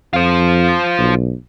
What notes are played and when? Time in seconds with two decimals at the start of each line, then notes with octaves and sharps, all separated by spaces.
0.13 F2 F4 C5
0.99 B1